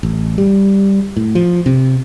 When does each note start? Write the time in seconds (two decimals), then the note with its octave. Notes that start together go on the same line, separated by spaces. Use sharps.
0.03 A1
0.38 G3
1.17 A2
1.35 F3
1.66 C3